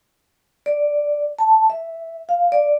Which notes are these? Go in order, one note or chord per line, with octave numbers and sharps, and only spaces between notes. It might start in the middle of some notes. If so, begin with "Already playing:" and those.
D5
A5
E5
F5
D5